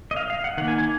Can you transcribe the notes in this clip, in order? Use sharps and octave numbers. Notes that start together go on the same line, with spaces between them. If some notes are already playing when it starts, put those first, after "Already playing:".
D#5
F5
F5
F#5
D#3 A#3 F#5
G#5
G#5